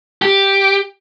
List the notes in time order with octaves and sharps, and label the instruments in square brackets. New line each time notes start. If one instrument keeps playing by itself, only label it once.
[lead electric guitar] G4